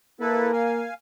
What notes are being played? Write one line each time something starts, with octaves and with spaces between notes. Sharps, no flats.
A#3 E4 A4 B4
F5 G#5